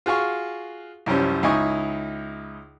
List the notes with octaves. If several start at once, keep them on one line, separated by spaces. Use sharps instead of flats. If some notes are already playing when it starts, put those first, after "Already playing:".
F4 F#4 G#4 F5 C#6
C2 F#2 F3 G3 C#4
C#2 D#4 E4 G#5 C#6 D#6